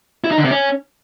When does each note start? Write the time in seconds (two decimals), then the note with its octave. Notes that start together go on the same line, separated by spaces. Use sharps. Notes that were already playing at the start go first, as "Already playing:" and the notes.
0.24 E4
0.31 D#4
0.38 D3
0.44 C3
0.51 C#4